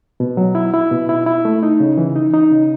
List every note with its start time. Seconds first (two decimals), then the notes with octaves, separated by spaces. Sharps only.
0.20 B2
0.37 F#3
0.55 E4
0.74 E4
0.91 B2
1.09 E4
1.26 E4
1.45 A3
1.63 D#4
1.80 C#3
1.98 E3
2.16 D#4
2.34 D#4
2.51 C#3